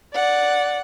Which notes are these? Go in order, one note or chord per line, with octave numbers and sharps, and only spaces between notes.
D5 F#5